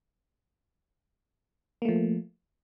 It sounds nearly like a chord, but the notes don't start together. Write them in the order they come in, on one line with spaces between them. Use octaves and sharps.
A#3 A3 F3